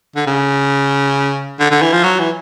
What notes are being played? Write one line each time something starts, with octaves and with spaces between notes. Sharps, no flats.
D3
C#3
D3
D3
E3
F3
F#3
E3